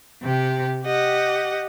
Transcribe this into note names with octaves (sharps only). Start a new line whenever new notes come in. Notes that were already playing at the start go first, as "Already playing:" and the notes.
C3 G4
G4 D#5 F#5